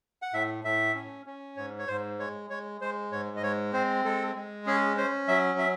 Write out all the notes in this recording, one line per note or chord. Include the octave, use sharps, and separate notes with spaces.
F#5
A2 E5
A2 E5
C#4
C#4
G#2 C#5
C#5
G#2 C5
G#3 C#5
G#3 C#5
G#3 C5
G#2 C#5
D#5
G#3 C#5
C4 C5
G#3 A4
G#3
C#4 G#4
C#4 C5
F#3 E5
E5